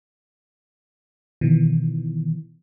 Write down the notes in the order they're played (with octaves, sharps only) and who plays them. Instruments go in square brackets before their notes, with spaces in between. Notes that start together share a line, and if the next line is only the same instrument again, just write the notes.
[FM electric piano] B2 D#3 E3